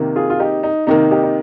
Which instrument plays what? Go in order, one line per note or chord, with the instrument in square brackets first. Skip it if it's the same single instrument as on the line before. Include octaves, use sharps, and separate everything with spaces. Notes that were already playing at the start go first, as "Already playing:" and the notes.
Already playing: [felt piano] C3 D#3 A#3
[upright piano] F4 G#4
F4
D#4 G4
D#4
[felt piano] C3 D#3 A#3 [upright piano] D#4
[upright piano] D#4 G4
D#4